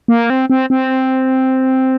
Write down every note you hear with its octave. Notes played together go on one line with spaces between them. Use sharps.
A#3
C4
C4
C4